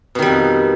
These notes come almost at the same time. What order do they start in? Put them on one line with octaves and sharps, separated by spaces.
B2 D#3 G3 F2